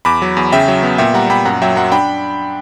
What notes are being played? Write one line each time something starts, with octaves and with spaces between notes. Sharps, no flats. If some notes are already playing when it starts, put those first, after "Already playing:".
E2 B5 D6
F#3
E2
C#3 E5 G5
F#3
B3
A#2 E5 G5
G3 F#5 A#5
A#2 G5 B5
F#2 F#5 A#5
F#3 E5 G5
F#2 F#5 A#5
D4 G5 B5